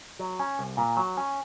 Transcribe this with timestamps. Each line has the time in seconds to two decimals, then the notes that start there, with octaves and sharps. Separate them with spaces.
0.19 F#3
0.40 C#4
0.59 C2
0.77 A#2
0.97 F#3
1.17 C#4